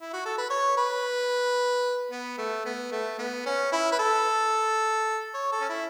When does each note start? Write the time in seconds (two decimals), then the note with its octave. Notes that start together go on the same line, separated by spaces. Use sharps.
0.01 E4
0.13 F#4
0.25 A4
0.38 B4
0.50 C#5
0.77 B4
2.11 B3
2.38 A3
2.65 B3
2.92 A3
3.19 B3
3.46 C#4
3.72 E4
3.92 B4
3.99 A4
5.34 C#5
5.52 A4
5.61 C#4
5.69 E4